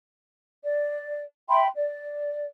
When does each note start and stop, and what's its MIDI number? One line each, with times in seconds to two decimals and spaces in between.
0.62 1.21 74
1.49 1.67 76
1.49 1.67 79
1.49 1.67 83
1.49 1.67 84
1.74 2.46 74